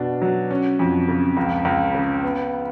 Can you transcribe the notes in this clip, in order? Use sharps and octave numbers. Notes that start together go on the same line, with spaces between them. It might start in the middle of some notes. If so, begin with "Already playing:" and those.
Already playing: B2 D4
F#3
C#4
F2
C#3
C#2
C#2
C#3
B3